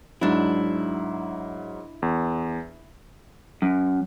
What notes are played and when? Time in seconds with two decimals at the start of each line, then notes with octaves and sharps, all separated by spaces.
0.21 G#2 F#3 D4 E4
2.02 E2
3.62 F#2